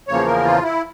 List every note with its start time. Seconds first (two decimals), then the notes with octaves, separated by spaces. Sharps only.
0.08 E2 C#3 F3 A#3 C#5
0.26 A#4
0.44 F4
0.63 E4